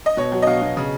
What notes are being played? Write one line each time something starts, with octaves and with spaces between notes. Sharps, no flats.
D#5
B2 C#5
F#3
D#5
B2 F5
B2
C#3